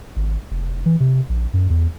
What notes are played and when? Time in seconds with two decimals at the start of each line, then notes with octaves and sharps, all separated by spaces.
0.16 G#1
0.51 F1
0.86 E3
1.00 C3
1.29 A#1
1.53 F#2
1.70 E2